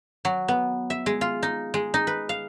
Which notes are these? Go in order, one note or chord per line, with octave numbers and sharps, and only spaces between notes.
F#3
B3
E5
G#3
F4
D#4
G#3
D#4
B4
F5